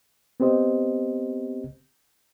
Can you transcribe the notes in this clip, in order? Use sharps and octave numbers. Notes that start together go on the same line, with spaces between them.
B3 C4 G4 C5 D#5